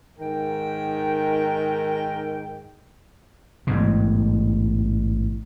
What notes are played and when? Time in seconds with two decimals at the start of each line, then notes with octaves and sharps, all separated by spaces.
0.19 G#2 D#3 A#4 G5
3.67 A1 G#2 B2